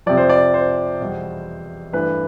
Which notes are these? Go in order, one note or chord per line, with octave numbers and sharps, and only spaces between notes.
F2 C3 F3 D5
C5
D5
C5
E2 B2 G3
G2 E3 A3 B4